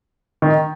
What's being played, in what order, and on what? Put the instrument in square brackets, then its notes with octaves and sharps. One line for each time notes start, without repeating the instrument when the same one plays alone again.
[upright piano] D#3